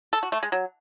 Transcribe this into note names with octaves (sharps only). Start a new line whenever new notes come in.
A4
F#4
A3
G#3
F#3